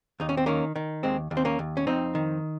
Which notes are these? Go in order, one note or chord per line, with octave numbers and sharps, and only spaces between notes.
D#2 D#4
C#4
C4
D#3 A#3 C#4
D#3
D#2 G#3 C4
D#2
C4
A#3 C#4
D#2
C#4
F2 C4 D#4
D#3